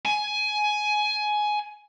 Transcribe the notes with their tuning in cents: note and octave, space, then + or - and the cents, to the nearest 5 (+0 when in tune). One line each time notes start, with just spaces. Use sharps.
G#5 +15